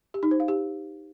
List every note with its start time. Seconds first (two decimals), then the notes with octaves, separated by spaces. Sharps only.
0.14 G4
0.23 D#4
0.31 C5
0.40 F5
0.48 G4